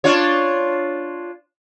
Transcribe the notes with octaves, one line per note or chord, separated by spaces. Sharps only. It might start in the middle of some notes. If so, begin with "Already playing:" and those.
D4 F4 C#5